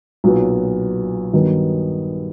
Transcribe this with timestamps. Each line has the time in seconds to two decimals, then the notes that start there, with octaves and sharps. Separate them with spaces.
0.24 B1 A#2 F#3 B3
1.33 G2 D#3 F#3 B3